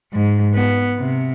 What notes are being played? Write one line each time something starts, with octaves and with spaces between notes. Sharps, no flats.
G#2
B3
C3